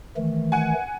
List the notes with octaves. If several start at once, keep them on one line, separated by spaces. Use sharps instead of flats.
D#3 E3 A3
F#5 G#5